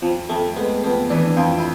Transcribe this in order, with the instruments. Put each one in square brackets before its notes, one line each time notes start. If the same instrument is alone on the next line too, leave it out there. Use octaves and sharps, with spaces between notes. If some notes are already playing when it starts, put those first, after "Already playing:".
[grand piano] F2 [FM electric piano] F3
[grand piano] F2 [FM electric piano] A3
[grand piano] G#3 [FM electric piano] B3
[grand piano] F2 [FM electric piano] B3
[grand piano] E3 [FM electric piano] D4
[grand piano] F2 [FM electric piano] F4
[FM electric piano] E4